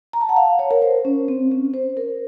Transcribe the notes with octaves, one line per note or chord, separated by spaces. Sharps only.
A#5
A5
F#5
F5
C#5
A#4
C5
C#4
C4
C#4
C5
A#4